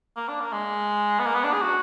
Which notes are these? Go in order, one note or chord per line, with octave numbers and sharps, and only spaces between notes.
A#3
D4
A#3
G#3
B3
A#3
B3
D4
G#4
F#4